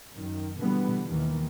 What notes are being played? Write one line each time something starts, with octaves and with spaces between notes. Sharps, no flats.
F#2 D#3
B2 D3 E3 G3 B3
D#2 D#3 E3